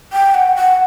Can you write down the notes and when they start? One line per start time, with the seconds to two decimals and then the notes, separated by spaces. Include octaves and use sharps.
0.13 G5
0.35 F#5
0.56 F#5